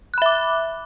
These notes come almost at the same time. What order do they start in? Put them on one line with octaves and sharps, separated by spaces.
F#6 B5 E5 D6